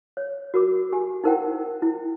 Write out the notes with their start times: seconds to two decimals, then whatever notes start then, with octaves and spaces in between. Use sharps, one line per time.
0.17 C#5
0.54 F#4 A#4 D6
0.92 G4 G#5
1.24 D#4 E4 A#4 C5 F#5 G5
1.82 E4